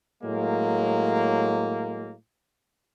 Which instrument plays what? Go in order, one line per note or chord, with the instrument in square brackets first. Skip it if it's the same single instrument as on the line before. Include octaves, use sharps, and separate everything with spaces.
[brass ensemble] A2 F#3 G#3 A#3